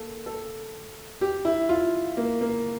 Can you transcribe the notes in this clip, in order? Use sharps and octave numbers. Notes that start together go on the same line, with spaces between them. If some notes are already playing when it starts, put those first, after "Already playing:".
Already playing: A#3 A4
A4
G4
E4
F4
A#3
A#3